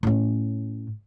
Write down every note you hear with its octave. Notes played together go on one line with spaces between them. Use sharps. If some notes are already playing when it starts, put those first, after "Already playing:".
A2 C#4